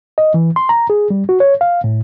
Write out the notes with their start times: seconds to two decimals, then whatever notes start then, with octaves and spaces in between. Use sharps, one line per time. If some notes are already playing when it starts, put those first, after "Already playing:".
0.18 D#5
0.34 E3
0.56 C6
0.69 A#5
0.90 G#4
1.10 G3
1.29 F#4
1.40 C#5
1.61 F5
1.84 A2